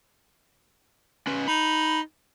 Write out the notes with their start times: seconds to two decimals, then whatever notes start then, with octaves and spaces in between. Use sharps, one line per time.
1.27 C#4 B4
1.48 D#4 B5